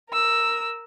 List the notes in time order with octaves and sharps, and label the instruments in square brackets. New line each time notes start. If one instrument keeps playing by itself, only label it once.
[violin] A#4 E6